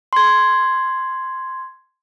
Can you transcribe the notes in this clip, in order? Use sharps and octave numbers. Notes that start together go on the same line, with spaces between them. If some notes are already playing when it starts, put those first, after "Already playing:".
C6 G#6